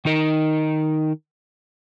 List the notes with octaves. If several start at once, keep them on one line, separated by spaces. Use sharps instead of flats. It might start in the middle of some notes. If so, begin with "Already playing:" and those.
D#3 D#4 A#4